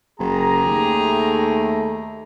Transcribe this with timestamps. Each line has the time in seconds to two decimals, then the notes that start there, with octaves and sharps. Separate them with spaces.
0.19 F#1 G4 G#4 A#5
0.66 D#2 A3